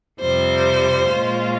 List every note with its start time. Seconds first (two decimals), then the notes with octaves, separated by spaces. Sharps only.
0.20 F2 C3 G3 C5
1.07 A#2 G#3 C#4 F4